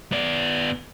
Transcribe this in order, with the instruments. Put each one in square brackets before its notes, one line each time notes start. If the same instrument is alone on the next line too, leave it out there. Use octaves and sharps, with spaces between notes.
[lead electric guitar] B3 D5